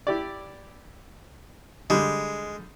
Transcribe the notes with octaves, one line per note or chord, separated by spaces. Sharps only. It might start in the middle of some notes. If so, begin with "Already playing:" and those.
E4 G4 D5
D3 G3 G#3